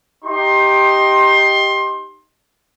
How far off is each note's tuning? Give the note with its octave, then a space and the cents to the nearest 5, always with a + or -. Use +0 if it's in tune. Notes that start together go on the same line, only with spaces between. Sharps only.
D#4 +0 G4 +0 C6 +20